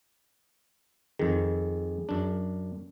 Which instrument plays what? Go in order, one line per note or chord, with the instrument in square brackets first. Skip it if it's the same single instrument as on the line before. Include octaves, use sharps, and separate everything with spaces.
[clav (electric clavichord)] F2 D#3 [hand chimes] G#4
[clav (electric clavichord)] F#2 D4